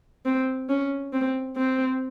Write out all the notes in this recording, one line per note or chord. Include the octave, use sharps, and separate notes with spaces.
C4
C#4
C4
C4